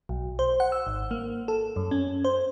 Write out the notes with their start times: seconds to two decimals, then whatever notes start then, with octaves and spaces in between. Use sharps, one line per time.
0.09 B1
0.39 C5
0.60 F#5
0.72 E6
0.87 G#1
1.11 A#3
1.48 A4
1.76 F#2
1.91 C#4
2.24 C5